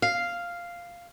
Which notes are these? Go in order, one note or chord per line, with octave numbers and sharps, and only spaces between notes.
F5